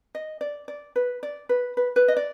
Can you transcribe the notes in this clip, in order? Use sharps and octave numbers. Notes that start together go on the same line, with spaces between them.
D#5
D5
D5
B4
D5
B4
B4
B4
D#5
D5